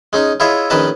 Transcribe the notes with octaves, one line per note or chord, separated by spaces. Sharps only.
G#3 C#4 D#4
E4 F4 G#4 C#5 D#5 E5
A#1 D#3 C#4 B4 D#5 A5